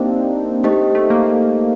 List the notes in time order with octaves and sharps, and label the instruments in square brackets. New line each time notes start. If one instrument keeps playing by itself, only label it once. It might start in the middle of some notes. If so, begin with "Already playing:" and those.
Already playing: [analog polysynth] A#3 C4 D4 D#4 [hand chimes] G4 C5 D#5 G5
[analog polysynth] A3 [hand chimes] D#4 G4 C5 D#5
[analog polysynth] A3
A#3